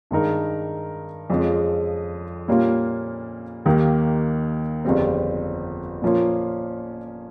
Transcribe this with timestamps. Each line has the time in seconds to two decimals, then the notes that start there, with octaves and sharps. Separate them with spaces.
0.11 G2 D#3 G#3 D#4 A#4
1.30 F2 C#3 F3 G#3
2.48 A#2 G3 A#3 C#4 F4
3.65 D#2 D#3 A#3 D#4 G4
4.85 G1 F2 C#3 G3 C4
6.02 A#2 F3 A#3 C#4 F4